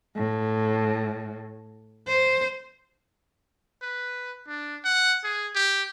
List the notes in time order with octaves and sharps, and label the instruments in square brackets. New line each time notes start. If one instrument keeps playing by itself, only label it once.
[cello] A2
C5
[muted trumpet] B4
D4
F#5
G#4
G4